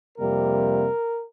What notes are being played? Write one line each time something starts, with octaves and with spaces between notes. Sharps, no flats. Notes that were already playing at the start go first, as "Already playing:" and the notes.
F2 C3 G3 A#3 A#4